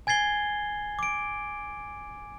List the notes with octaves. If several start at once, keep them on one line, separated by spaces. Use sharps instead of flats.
G#5 G#6 A6 C7 G7
D6 D7